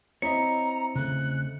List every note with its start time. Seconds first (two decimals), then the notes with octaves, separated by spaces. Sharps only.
0.22 C4 E4 C#5 D#5 E5 A#5 C#7
0.95 C#3 A3 F#6